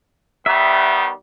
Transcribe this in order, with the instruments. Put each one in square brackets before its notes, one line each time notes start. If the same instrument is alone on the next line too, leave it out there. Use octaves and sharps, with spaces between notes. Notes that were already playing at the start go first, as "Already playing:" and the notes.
[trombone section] D#3 G3 B3 [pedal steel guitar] E5